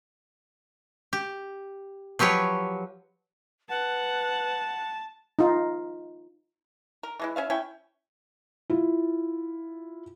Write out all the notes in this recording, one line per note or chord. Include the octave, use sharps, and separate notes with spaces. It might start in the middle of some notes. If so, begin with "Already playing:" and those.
G4
F3 F#3 G4 B4 C#5
B4 F#5 A5
D#4 F4
A#4
E3 G#3 E4
C#4 E5 F5
C#4 E4 G5 G#5
E4 F4